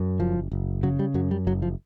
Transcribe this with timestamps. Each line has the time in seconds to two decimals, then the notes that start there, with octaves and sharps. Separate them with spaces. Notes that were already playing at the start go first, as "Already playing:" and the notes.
Already playing: F#2
0.20 F#1 F3
0.52 F#1
0.83 C#3 F#3
0.99 G3
1.14 F#2 F#3
1.31 G3
1.47 F#1 F#3
1.62 F3